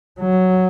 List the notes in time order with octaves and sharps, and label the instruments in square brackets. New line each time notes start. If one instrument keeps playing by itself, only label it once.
[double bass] F#3